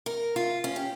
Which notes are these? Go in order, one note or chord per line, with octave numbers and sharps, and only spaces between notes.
A#4
F4
C#4
G4